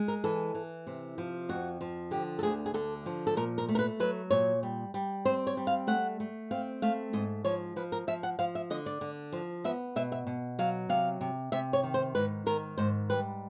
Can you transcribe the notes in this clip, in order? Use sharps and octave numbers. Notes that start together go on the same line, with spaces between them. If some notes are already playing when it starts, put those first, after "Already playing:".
Already playing: G#3
A#4
E3 A4
E3
C3
F3
F2 F#4
F3
D3 G4
A4
D2 G#4
G#4
D3 A4
F3
A4
A#2 A#4
A#4
A3
A#4
B4
F#3 B4
A#2 C#5
G3
G3
C4 C5
C#5
G3
F5
A3 F#5
A3
C4 F5
A3 F5
G#2 D#5
F3 C#5
F3 B4
A#4
F3 E5
F#5
F3 F5
E5
D3 D#5
D5
D3
F3
B3 E5
B2 E5
E5
B2
F#3 F5
C3 F5
C3
C3 E5
C#5
D#3
C5
G#2 B4
D#3 A#4
G#2 C5
G3 B4